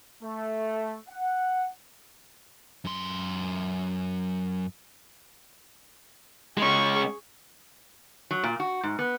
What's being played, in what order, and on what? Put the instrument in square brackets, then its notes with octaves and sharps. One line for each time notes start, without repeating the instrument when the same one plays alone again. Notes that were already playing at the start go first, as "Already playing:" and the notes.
[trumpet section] A3
F#5
[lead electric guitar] F#2 C6
[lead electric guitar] G#3 C#4 [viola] G#4 C#6
[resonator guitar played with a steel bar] F#3
A#2
F#4
G#2
B3